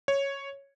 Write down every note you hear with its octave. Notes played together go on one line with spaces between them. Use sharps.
C#5